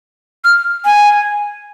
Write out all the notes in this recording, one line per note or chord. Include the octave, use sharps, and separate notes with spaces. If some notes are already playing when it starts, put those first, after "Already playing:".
F6
G#5